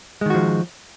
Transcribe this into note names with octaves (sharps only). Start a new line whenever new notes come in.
D#3 F3 G#3 F#4